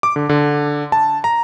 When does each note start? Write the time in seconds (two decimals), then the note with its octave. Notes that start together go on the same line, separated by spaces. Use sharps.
0.03 D6
0.16 D3
0.29 D3
0.92 A5
1.24 A#5